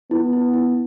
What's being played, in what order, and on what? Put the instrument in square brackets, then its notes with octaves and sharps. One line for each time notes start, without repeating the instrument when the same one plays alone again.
[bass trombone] B3 [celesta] E4
[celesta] E4
E4